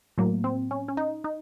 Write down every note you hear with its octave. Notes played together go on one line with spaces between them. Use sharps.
A2 F#3 A#3
C4
C#4
C#4
D#4
D#4